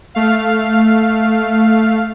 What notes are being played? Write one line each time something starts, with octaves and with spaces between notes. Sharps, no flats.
A3 F5